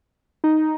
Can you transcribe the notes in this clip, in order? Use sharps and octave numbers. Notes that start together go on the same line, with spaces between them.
D#4